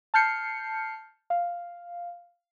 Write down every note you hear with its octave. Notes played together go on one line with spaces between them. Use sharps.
A5 F6 G6 C7 C#7
F5